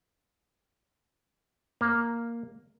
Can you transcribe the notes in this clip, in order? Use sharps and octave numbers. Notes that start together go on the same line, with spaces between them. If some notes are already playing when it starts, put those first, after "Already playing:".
A#3